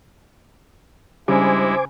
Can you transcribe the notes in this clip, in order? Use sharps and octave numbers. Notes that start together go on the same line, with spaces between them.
G2 C#3 G3 G#3 E4 C5 G#5 D6